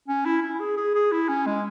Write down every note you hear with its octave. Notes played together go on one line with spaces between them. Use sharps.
C#4
E4
E4
G#4
G#4
G#4
E4
C#4
G#3